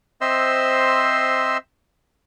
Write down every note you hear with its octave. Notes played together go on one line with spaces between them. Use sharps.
C4 C5 D#5 E5 C6 E6